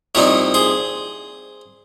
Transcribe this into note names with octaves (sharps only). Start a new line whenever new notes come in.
C2 A#2 F3 C4 D#4 A#4 C#5
G#4 C5